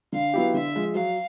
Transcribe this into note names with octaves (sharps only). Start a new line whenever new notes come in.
D3 F5
F#3 B3 E4 G4
D3 E5
F3 G#3
F#3 F5